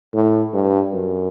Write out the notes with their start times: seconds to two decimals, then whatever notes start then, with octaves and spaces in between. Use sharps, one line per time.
0.14 A2
0.54 G2
0.93 F#2